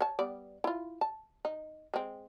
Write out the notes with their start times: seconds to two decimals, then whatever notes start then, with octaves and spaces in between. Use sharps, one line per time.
0.01 C#5 A5
0.19 G3 B3 D5
0.64 E4 F4
1.01 A5
1.45 D#4
1.94 G#3 C4